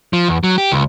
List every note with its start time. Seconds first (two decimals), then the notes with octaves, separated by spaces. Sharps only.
0.13 F3
0.29 E2
0.44 F#3
0.58 G4
0.72 C#2